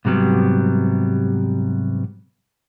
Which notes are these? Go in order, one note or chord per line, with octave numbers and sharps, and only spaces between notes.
G#2 C3 F#3 G3 B3